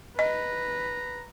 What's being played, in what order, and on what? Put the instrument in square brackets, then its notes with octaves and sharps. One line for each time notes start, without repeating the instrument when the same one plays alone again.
[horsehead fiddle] B4 [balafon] D#5 [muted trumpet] A#5